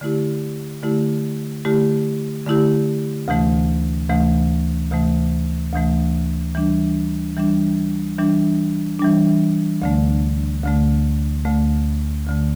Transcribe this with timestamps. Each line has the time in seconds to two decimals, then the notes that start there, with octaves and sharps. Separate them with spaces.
0.01 D3 A3 E4 G4
0.83 D3 A3 E4 G4
1.65 D3 A3 E4 G4
2.46 D3 A3 E4 G4
3.28 D2 C3 E3 A3
4.09 D2 C3 E3 A3
4.91 D2 C3 E3 A3
5.73 D2 C3 E3 A3
6.55 E3 G3 D4
7.37 E3 G3 D4
8.18 E3 G3 D4
8.99 E3 G3 D4
9.82 D2 D3 A3
10.63 D2 D3 A3
11.45 D2 D3 A3
12.27 D2 D3 A3